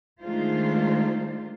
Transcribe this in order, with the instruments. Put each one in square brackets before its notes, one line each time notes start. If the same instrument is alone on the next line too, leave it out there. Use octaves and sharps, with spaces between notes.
[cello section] D#3 G#3 A3 D4 F4 C5